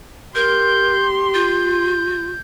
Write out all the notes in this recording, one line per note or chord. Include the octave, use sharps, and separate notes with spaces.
G4 A#4 C6 G6
F4 G6